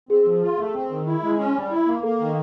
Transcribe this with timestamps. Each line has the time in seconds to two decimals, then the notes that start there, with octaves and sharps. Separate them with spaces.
0.09 C4 G#4
0.25 F3
0.42 F4
0.57 A3
0.74 C4
0.90 D#3
1.07 E4
1.23 G#3
1.39 C#4
1.55 G3
1.71 E4
1.87 A#3
2.03 A#3 A4
2.19 D#3